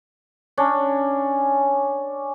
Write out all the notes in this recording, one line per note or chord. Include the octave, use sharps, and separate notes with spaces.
C#4 D4